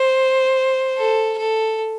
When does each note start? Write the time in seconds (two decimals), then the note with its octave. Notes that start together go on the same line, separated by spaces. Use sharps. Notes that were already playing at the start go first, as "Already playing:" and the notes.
Already playing: C5
0.98 A4
1.38 A4